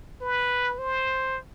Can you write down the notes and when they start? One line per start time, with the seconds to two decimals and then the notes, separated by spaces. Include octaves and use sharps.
0.21 B4
0.78 C5